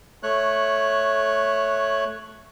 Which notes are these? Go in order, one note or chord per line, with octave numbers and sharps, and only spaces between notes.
A3 C#5 F#6